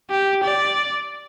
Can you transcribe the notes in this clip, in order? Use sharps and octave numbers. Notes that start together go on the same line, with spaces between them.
G4
D5